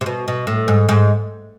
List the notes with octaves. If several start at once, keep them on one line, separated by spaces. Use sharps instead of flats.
C3
B2
B2
A2
G#2
G#2